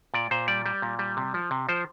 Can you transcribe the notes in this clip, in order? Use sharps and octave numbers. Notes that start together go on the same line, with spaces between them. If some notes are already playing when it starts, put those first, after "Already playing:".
A#2 D5
A#2 C5
G3 D5
G3
A#2
G3
C3
F3
C3
F3 C5